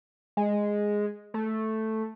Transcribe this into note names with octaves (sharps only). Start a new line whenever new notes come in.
G#3
A3